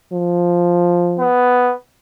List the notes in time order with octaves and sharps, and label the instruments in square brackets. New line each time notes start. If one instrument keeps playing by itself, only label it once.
[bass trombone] F3
[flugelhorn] B3